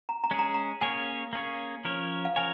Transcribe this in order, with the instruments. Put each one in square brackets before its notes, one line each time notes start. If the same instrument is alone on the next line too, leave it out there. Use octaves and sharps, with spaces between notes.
[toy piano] A#5
A#5
[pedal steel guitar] G#3 C#4 G#4
[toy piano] A#5
A#5
[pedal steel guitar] A#3 C#4 G#4 C#5 [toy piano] G#5
[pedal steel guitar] A#3 C#4 G#4 C#5
F3 C#4 A#4 C#5
[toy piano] F5
[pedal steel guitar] F3 C#4 A#4 C#5 [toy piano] G#5